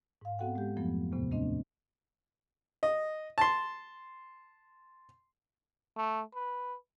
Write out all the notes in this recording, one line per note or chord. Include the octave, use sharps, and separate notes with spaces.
G#2 F5
B3 C4 F#4 A4 F#5 G5
G#3 G4
F2 F3 F#3 A3 B3
D#2 A2 C3 B3
A3 C4 D4 D#5
D#5
A5 C6
A3
B4